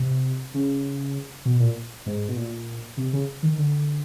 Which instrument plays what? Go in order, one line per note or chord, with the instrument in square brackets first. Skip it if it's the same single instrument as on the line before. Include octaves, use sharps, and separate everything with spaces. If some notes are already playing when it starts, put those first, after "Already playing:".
Already playing: [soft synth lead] C3
C#3
B2
A#2
G#2
B2
A#2
C3
C#3
D#3
D3